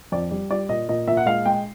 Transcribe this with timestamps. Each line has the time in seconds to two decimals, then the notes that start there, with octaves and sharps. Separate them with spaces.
0.12 F2 D5
0.31 G3
0.50 G3 D5
0.69 A#2 D#5
0.89 A#2 D#5
1.08 A#2 E5
1.17 F#5
1.26 G#3 F5
1.46 G#3 G5